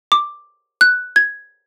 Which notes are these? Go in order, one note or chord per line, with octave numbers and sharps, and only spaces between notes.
D6
F#6
G#6